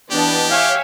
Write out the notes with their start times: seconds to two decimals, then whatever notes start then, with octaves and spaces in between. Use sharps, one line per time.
0.11 E3 B3 D4 G4 D5 D#5 A5
0.51 C#5 E5 F5 G5 G#5